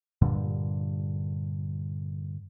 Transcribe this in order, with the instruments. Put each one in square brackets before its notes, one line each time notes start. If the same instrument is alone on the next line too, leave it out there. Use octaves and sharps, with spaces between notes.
[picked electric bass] G2 A#2 D3 G3